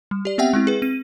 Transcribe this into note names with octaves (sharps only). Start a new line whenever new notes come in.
G3
G4 D5
B3 C4 G4 E5 F#5 G5
G#3 C4 E4
G#4 B4
C4 D#7